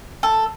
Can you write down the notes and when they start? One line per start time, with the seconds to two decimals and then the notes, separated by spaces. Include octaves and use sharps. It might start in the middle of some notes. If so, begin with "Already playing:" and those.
0.23 A4